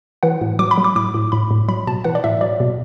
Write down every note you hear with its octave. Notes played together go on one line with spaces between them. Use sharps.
E3 F#5
A2
F#3 D6
B5
F#3
D6
A2 D6
A2
A2 B5
A2
F#3 B5
B2 A5
E3 F#5
D5
A2 E5
F#3 D5
B2